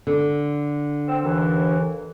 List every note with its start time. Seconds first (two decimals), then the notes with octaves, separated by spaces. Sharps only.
0.07 D3
1.07 C4 E6
1.24 D#2 E3